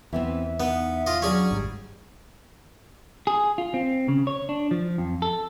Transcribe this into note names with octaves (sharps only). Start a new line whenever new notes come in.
E2 E3 B3 C4 E5
B3 D#4
F4 D#5
F#3 C#4 D4 G#4 D5
G#1 G#2 G3
G#4
F4
C4
C#3
C#5
D4
F3
F2
A4